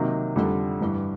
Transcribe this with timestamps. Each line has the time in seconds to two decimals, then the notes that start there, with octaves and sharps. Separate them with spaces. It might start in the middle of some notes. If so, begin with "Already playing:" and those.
Already playing: C3 D#3 F#3 A#3 D#4
0.36 F2 D3 G3
0.81 G2 E3 G3